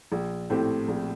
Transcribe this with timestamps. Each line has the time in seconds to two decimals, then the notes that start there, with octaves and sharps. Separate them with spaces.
0.12 A#1
0.50 A2 A3 C4 G4
0.88 A#1